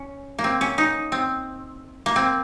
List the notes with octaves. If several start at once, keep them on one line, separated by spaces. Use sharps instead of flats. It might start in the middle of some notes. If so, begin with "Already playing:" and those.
Already playing: C#4
A#3
C4
C#4
D#4
C4
A#3
C4